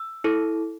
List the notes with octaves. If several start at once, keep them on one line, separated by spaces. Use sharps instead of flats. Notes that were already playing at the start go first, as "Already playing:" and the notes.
Already playing: E6
E4 A4